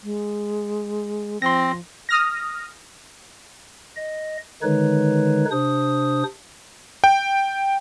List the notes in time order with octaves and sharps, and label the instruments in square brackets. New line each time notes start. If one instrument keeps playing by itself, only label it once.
[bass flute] G#3
[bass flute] F3 [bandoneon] C4 [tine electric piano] C6 A#6
[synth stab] D#6 F6 A#6
[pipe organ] D#5
D3 D#3 G#3 D#4 B4 C#5
C3 D4 C5 D#6
[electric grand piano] G5